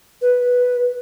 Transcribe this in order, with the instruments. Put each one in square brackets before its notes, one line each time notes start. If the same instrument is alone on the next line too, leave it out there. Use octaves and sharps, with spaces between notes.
[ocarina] B4